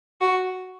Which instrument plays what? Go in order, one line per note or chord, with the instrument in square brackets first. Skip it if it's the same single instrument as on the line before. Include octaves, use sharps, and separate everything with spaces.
[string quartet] F#4